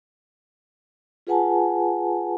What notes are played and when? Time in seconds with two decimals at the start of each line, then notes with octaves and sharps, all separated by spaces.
1.27 F4 G#4 B4 F#5 G#5 A5